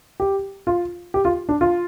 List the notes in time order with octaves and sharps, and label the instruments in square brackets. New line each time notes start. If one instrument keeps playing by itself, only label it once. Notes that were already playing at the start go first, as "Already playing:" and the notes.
[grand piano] G4
F4
G4
F4
D4
F4